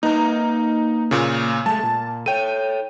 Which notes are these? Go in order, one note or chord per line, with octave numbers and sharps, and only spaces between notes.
A#3 D#4 B4 A#5
A#2 C#3
G#3 A3 A5
A#2
A4 C#5 G5 D#7